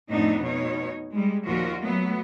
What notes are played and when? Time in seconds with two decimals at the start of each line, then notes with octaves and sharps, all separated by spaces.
0.11 F2 A2 A3 B3 D4 D#4
0.44 B2 D#4 C#5
1.15 G3 G#3
1.47 D#2 A#2 F3 F4 F#4 A#4
1.83 F#3 A3 B3